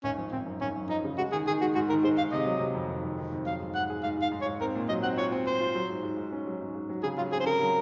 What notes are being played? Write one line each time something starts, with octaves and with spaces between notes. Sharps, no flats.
G#1 C#4
F3
G#1 C4
F#2
G#1 C#4
F#2
F3 D#4
C#3
G#3 F#4
D#3 G#4
D#3 G#4
G#3 F#4
G#2 F#4
D#3 A#4
G#3 C5
G#2 F5
C3 D#5
F#3
C3
F2
D#3
F2
D#3
F2
F#3 F5
G#2
G#2 F#5
G#4
G#2 F5
G#2 F5
G#2
C#5
G#2
C4 A#4
A#2
F#3 D#5
C4 F#5
F4 C#5
C4
C4 C5
F4
F#3
G#2
G#2
G#2
C#4
F#3
G#2
G#2
F#3
C#3 G#4
F#3 F4
C4 G#4
C5
C#3 A#4
F#3